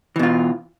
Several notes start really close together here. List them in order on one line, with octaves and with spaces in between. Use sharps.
E3 B2 F4